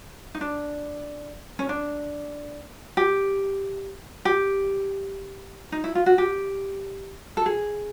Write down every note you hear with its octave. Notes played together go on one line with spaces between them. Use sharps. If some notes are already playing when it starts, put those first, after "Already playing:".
D#4
D4
C#4
D4
G4
G4
D#4
E4
F4
F#4
G4
A4
G#4